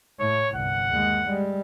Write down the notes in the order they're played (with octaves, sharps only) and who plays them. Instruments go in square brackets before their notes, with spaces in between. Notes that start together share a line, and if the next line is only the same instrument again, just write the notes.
[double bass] A2 [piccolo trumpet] C#5
[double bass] G1 C2 [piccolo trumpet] F#5
[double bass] D#2 G#3
G3 G#3